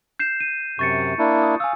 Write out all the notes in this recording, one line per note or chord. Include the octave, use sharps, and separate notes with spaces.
G6 C7 E7
D#7
F#2 C3 C#6 A6 C#7
A#3 D4 E4
D#6
F5 G#5 E6